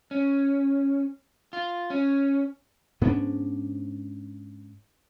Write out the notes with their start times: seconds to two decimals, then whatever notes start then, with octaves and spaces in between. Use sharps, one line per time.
0.11 C#4
1.53 F4
1.90 C#4
3.01 G#2 B3 C#4 D4